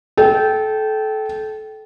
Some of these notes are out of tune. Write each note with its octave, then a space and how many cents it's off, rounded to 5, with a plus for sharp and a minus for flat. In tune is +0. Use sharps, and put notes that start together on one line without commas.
A4 -25 G5 -15